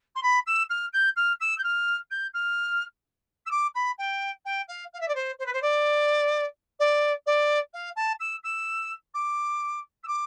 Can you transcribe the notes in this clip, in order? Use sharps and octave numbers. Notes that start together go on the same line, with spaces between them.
C6
B5
E6
F6
G6
F6
E6
G6
F6
G6
F6
E6
D6
B5
G5
G5
F5
F5
E5
D5
C5
C5
B4
C5
D5
D5
D5
F5
A5
E6
E6
D6
E6
D6